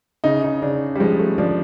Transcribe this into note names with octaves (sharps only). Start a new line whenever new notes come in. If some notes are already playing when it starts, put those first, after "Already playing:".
C#3 D#4
D#4
C#3 D4
G3
F3 G#3
A3
F3 D4